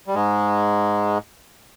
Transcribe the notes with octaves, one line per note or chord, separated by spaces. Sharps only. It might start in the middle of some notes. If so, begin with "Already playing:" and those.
G3
G#2 G#3